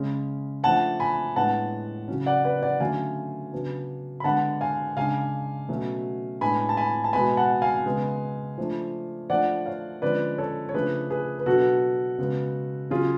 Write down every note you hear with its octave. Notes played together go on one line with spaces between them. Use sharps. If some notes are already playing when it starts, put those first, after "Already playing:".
Already playing: C#3 G#3 C#4
F3 A3 D4 F#5 A5
G#5 B5
A2 G#3 B3 D4 F#5 A5
C#3 F#3 C#4
D5 F#5
B4 D5
D5 F#5
D3 F#3 A3 C#4 F5 G#5
C#3 F#3 B3 D4
B5
D3 G#3 B3 D4 F#5 A5
F5 G#5
C#3 G#3 D4 F5 G#5
B2 F#3 A3 C#4
A2 G#3 B3 D4 G#5 B5
A5
G#5 B5
A5
B2 G#3 B3 G#5 B5
F#5 A5
F5 G#5
C#3 G#3 B3
F3 A3 D4
F3 A3 D4 D5 F#5
C#5 F5
D3 F3 G#3 C#4 B4 D5
A4 C#5
C#5
C#3 F3 A3 D4 G#4 B4
G#4 B4
B4
B2 F#3 B3 D4 F#4 A4
C#3 G#3 B3
C#3 F#3 C#4 F4 G#4